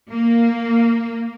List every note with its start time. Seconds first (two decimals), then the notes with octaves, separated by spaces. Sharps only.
0.11 A#3